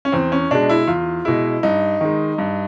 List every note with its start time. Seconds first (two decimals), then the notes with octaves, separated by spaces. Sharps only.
0.05 C#4
0.12 E2 C4
0.32 C#4
0.51 B2 G#3 D4
0.69 E4
0.87 E2 F4
1.25 B2 G#3 E4
1.63 G2 D#4
2.01 D#3 G#3
2.38 G2